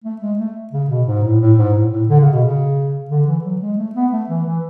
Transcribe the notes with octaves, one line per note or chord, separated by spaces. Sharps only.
A3
G#3
A3
C#3
B2
G#2
A2
A2
G#2
A2
A2
D3
C#3
B2
C#3
D3
E3
F#3
G#3
A3
B3
A3
E3
E3